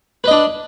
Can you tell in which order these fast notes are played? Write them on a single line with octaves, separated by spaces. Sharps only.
B4 D#5 D4